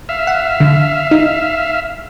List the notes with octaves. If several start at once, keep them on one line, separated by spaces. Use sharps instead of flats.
E5 F5
F#5
D3
D#4